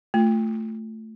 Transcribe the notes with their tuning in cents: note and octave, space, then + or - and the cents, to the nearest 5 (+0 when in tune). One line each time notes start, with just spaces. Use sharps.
A3 +0 F4 +10